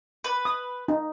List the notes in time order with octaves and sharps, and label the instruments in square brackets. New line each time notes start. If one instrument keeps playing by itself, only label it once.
[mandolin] B4
[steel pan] D#6
D#4